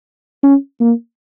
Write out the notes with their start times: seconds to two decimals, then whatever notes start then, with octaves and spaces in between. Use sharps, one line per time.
0.43 C#4
0.80 A#3